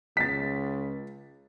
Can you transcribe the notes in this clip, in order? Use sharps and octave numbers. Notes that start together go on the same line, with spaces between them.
C#2 A6 B6